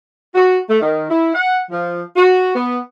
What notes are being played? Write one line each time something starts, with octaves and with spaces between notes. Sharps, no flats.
F#4
A3
D#3
E4
F#5
F3
F#4
B3